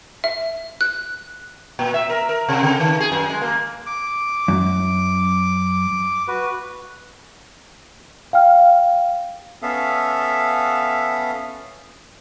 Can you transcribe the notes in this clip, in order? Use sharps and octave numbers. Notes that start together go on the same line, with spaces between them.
E5
F#6
A#2
E5
A#4
A#4
C3
C#3
D#3
G#4
F#2
G#3
A#3
D6
F#2
F#4 B4
F5 G5 F6
B3 C#4 A4 E5 F5